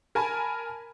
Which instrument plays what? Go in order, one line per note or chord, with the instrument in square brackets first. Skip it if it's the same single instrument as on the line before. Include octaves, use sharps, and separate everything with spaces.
[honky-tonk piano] A#4 G#5 A5 B5